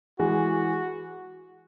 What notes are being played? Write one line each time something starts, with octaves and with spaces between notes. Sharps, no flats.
E3 G#3 F#4